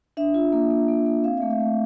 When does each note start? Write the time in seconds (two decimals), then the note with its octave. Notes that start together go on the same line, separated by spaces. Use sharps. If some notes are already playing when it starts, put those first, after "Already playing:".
0.17 D4 E5
0.34 F4
0.53 A#3
0.70 A#3
0.88 A#3
1.06 A#3
1.24 C4 F5
1.38 E5
1.42 A3
1.51 E5
1.60 A3